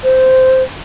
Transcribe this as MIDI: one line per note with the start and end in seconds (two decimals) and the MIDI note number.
0.04 0.63 72